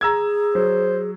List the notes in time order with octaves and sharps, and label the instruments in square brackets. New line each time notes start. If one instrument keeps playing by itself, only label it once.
[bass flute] G#4 [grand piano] A#5 E6 G#6
[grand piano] F#3 [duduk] C5